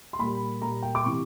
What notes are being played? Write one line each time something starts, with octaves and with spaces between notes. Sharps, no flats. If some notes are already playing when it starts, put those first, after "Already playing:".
C6
A#2 G3 A#3 B5
A#2 G3 A#3 A#5
G5
D6
C3 E3 C#6